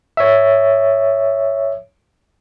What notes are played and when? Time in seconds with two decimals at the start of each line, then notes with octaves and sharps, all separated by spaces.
0.17 C#5 E5